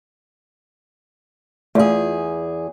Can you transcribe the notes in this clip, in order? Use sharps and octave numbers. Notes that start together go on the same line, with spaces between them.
E2 A3 F4 G#4